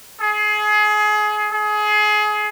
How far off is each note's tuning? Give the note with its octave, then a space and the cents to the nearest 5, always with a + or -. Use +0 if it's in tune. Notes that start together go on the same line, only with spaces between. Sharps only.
G#4 +25
G#4 +25